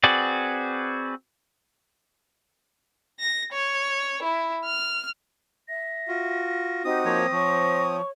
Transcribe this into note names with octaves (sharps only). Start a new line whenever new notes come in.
C4 F#4 G#4 B4 D5
A#6
C#5
E4
F6
E5 A#6
F4 F#4
C4 D#4 F#4 G4 D#6
F3 A#3 C#5 A#6
F3 C#5 C#6